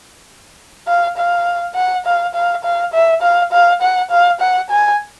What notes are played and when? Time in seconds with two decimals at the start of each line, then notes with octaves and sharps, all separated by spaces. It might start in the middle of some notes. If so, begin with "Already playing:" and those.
0.87 F5
1.17 F5
1.75 F#5
2.05 F5
2.34 F5
2.64 F5
2.93 E5
3.22 F5
3.52 F5
3.81 F#5
4.10 F5
4.40 F#5
4.70 G#5